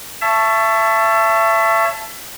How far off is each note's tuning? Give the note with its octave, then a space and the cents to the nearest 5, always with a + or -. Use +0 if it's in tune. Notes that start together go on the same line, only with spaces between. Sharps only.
C#5 +5 E5 +30 A5 +0